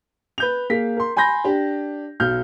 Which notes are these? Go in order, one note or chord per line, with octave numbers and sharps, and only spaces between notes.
B4 G6 F7
A#3 G#4 F5 B6
A#4 C6
G#5 B5 C6 G6 A#6
D4 G4
B1 F6 G6